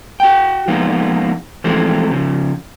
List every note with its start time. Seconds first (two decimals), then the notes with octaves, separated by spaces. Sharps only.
0.20 F#4 G5
0.68 F3 G#3 A#3 B3 D#4 F4
1.64 E3 F3 G#3 A3 C4
2.11 C#3 F3